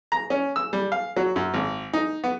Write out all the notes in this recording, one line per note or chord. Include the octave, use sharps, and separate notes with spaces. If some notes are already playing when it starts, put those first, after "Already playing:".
A#5
C#4
E6
G3
F5
F#3
F#2
G#1
D#4
B3